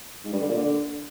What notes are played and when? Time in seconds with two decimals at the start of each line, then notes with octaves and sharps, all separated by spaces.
0.24 G#2
0.33 G2
0.41 D3
0.49 A#2
0.57 D3